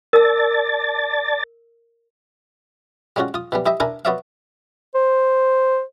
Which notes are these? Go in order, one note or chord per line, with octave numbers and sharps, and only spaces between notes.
A#4 D5 A5 E6 A6
G3 G#3 C#4 F4 F#4
F4 D#6
B2 E3 G3
E4 G4 D#5 E5
D4 E4 A#4 G#5 A#5
B3 F#4 C#5 D5 E5 F5
C5